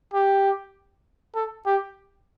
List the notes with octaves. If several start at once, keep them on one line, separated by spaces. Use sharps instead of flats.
G4
A4
G4